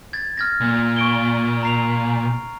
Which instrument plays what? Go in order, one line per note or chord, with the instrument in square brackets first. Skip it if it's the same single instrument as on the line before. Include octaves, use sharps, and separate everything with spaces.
[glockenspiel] G#6 A6
F6 G#6 A#6
[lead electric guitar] A#2
[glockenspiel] C#6 D7 G7
A#5 C7 F7